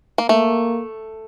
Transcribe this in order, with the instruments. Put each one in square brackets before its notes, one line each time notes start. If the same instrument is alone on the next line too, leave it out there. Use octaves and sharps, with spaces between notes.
[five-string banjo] A#3
[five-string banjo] A3 [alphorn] A#3